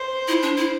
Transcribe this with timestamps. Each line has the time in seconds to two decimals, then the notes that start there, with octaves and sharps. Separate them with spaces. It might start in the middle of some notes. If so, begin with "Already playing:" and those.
Already playing: C5
0.28 E4
0.43 D4
0.57 E4